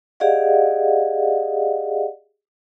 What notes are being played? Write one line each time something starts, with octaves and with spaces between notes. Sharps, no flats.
G4 G#4 D5 D#5 F5 F#5